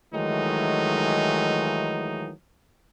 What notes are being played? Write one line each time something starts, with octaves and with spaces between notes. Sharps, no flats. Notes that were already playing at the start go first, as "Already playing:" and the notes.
D#3 E3 F#3 G#3 A3 D#4